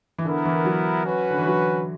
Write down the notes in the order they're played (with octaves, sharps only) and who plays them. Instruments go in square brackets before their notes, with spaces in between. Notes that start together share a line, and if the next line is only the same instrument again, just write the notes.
[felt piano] E3
[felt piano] D3 [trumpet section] B3 E4 A#4
[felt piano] E3
F#3
[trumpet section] C#4 F#4 B4
[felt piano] D3
E3
F#3